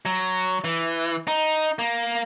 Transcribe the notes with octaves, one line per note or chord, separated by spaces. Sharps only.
F#3
E3
D#4
A#3